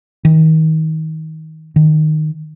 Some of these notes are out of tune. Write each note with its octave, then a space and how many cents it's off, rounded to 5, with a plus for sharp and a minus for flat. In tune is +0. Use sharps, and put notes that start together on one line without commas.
D#3 +30
D#3 -10